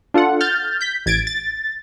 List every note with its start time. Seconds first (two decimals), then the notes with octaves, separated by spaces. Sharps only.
0.14 D4 F4 A4 F#5
0.41 F6 G6 A6
0.81 G6 B6
1.06 A1 G#6 A6 D7
1.27 A6